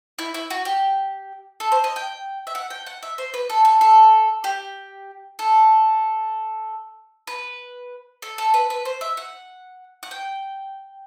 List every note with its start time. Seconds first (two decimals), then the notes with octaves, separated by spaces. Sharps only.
0.19 E4
0.34 E4
0.50 F#4
0.65 G4
1.60 A4
1.72 C5
1.84 D#5
1.96 G5
2.47 E5
2.55 F#5
2.70 G5
2.86 F#5
3.03 E5
3.18 C5
3.34 B4
3.50 A4
3.65 A4
3.81 A4
4.44 G4
5.39 A4
7.27 B4
8.22 A4
8.38 A4
8.54 B4
8.70 B4
8.85 C5
9.01 E5
9.17 F#5
10.03 F#5
10.11 G5